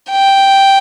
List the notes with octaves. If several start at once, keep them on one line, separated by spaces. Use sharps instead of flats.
G5